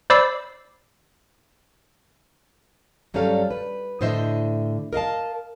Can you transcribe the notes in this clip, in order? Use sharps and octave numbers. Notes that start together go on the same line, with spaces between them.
C5 D5 B5 D6 E6 C7
G2 F#3 G3 C#4 A4 F5
B4
A2 D3 C5 D#5 E5
A#4 D#5 F5 A5